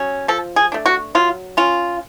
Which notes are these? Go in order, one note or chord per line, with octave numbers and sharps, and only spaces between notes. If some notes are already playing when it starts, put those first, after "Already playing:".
Already playing: F#3 C#4
F3 A4
G#4
A3 D4
F#4
F#3 F4
C#4 F4